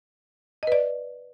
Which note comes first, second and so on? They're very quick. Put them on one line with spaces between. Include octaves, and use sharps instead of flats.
D#5 B4 D5